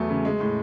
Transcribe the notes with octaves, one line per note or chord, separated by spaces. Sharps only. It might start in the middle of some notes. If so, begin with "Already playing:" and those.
Already playing: E2 F#3 A3
C#3
G#3
A2